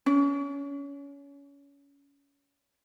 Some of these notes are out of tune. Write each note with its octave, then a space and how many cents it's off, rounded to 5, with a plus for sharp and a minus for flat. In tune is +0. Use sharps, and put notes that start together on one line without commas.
C#4 +25